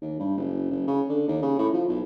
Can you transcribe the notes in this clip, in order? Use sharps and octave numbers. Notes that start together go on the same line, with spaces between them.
D#2
G2
F#1
F#1
C#3
D3
D#2
C#3
A2
F3
B1